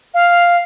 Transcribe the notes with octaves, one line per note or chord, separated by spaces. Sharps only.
F5